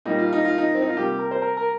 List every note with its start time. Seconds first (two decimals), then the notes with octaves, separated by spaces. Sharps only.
0.05 A#2 G3 A#3 D#4
0.19 F4
0.33 D#4
0.45 F4
0.58 D#4
0.75 C4
0.82 D#4
0.89 F4
0.97 C3 G3 A#3 G4
1.19 A#4
1.31 C5
1.42 A#4
1.57 A#4